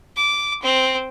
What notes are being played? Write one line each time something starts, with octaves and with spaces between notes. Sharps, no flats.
D6
C4